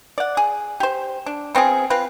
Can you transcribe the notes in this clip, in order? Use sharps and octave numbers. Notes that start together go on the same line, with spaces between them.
D5 F#5
G#4
G4 C5
D4
B3 C4 F4 G#4
C4 F4 B4